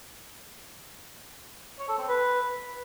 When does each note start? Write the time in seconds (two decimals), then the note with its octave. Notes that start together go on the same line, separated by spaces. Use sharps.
1.79 C#5
1.89 A4
1.99 C4
2.08 B4